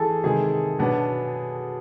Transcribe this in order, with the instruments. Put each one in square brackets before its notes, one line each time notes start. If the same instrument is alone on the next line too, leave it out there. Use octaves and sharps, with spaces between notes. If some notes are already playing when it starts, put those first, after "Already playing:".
Already playing: [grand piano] E3 [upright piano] G#4 A4
[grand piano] C3 D#3 G#3 [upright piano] G#4
[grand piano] B2 F#3 B3 D4